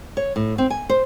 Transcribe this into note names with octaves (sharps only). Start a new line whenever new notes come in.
C#5
A2
C4
G#5
C5